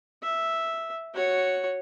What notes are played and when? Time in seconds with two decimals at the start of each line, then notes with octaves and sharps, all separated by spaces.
0.23 E5
1.14 F#4 C#5